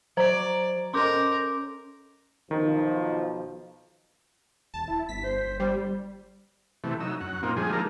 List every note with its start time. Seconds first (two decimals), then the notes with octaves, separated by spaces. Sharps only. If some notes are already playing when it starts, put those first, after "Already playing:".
0.17 F#3 C5 D5 A#5
0.94 C#4 A4 A#4 D#5 C6 D6 G6
2.51 B1 D#3 F3
4.74 D#1 A5
4.88 E4
5.09 G1 B6
5.24 C5
5.45 G1
5.60 G3 C5
6.84 C3 E3 A3
7.00 F#3 D#4 E6
7.21 F#2 F#5
7.43 A#2 A#3 C4 D#4 F4
7.57 D3 F3 G3 G#3 G#4
7.73 F3 G#3 A#3 D#4 A4 A#4